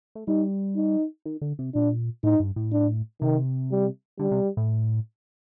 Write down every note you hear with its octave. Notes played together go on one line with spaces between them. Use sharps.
A3
G3 D#4
D#4
D#3
D3
C3
A#2 D4
A2 D#4
G2
A2
D4
C3 D#3
G3
D3 G3
C3
A2